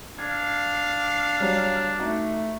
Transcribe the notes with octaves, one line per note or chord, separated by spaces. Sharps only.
D4 F5 G#6
F#3 G3
A3 D#4 F#4